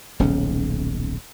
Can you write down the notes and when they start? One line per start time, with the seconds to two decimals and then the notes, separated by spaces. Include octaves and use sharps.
0.19 D#1 B1 C#3 C#4